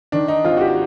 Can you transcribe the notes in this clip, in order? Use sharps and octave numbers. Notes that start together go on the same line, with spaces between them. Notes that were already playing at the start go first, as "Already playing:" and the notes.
D#3 D4
D#4
G#1 F4
F#4
G4